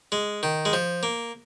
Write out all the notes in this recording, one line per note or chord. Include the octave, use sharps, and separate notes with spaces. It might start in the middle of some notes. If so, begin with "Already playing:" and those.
G#3
D#3
G#3
F3
A#3